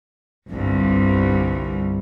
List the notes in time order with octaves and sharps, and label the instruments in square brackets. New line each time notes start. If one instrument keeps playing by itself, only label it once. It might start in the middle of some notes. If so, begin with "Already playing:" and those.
[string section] G1 C2 G2